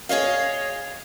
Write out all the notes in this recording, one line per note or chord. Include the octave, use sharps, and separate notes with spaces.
G#4 C#5 D#5 F5